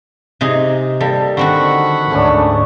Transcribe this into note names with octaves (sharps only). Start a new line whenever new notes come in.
C3 D#4 G#4
G3 A#3 A4
D3 D#3 C4 F#4 F#5 B5 C#6
D2 G#2 A3 C#4 D4